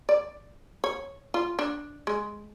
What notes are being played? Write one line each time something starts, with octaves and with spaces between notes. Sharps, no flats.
D5
C#5
F4
D4
G#3